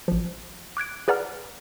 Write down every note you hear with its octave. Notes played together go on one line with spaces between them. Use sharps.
A1 F3
D6 F#6 G#6 D7
G#4 B4 D5 F#5 A#5 F6